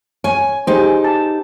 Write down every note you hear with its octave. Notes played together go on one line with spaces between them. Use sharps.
C#5 G#5
D#4 G4 G#4 C5
A5